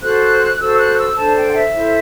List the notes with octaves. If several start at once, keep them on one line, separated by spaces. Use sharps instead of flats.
F#4 A4 C5 F#6
F#4 A4 C5 E6
F#6
E6
D4 A4 C5 A5
G5
F#5
E5
E4 A4 C5